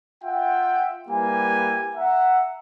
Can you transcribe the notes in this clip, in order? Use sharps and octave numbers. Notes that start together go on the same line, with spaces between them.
F4 E5 F#5 G5
G3 A#3 E4 G4 B4 G#5
E5 F#5 A#5